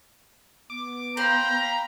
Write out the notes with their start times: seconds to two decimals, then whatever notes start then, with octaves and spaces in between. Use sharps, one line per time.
0.70 B3 D6
1.17 C5 F5 G5 A#5 B5